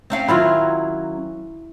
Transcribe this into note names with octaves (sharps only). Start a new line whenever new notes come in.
C4 C#4 F5
D#3 F#3 C#4 E4 F4